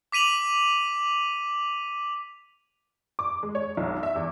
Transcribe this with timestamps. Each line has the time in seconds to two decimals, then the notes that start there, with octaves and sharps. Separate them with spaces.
0.12 D6 B6 D#7 F7 F#7
3.19 D6
3.43 G#3
3.55 C#5
3.77 B1
4.03 E5
4.16 E2